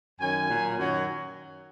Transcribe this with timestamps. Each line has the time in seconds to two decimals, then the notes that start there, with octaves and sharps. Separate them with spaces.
0.20 F#2 D#3 F#3 G#5
0.48 A#2 F#3
0.76 F#2 D#3 F#3